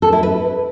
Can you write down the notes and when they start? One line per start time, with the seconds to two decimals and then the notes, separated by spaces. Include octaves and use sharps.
0.02 A4
0.13 E4
0.23 B4